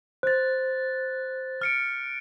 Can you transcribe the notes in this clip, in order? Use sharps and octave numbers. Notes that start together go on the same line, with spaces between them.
C5 F#6 A6
F6 C#7 D7